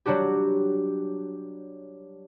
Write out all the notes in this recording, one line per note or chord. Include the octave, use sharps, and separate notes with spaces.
F#3 G3 D4 F#4 G4